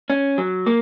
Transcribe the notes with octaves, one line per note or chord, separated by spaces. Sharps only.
C#4
F#3
A#3